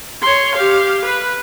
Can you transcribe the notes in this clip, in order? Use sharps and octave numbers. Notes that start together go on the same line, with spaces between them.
C#5 C6
G4 F5
B4